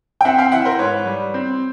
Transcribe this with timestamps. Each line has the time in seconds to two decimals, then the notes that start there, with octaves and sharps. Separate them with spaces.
0.21 G5
0.25 C4 E5 F#5
0.38 F5 G5
0.52 E3 E5 F#5
0.65 A#4 C5
0.79 G#2 B4 C#5
1.06 G3
1.34 C4